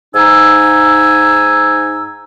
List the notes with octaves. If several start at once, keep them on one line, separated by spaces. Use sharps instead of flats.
G#2 D#4 G#5 E6